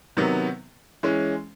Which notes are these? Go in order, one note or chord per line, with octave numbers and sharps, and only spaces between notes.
C3 D#3 F#3 B3
E3 G#3 C#4